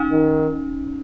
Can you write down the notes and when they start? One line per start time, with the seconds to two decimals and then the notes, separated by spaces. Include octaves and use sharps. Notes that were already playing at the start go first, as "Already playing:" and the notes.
Already playing: C#4 D#4
0.12 D#3